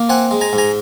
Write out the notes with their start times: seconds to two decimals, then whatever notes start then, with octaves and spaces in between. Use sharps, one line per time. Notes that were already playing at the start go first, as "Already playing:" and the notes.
Already playing: A#3
0.09 C4 F#5 G#5
0.31 G#3
0.41 G#5 A#5
0.53 G#2
0.58 G#5 A#5